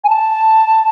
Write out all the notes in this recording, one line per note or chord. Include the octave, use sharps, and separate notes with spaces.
G#5
A5